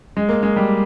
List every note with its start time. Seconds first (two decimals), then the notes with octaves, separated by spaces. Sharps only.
0.17 G#3
0.29 A#3
0.43 G#3
0.56 G3